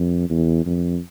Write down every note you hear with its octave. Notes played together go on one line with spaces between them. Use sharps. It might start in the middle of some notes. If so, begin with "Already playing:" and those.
Already playing: F2
E2
F2